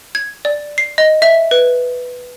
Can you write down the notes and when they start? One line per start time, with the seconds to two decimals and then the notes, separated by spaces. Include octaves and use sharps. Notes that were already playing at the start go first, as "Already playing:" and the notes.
0.15 G#6
0.45 D5
0.78 C7
0.98 D#5
1.22 E5
1.51 B4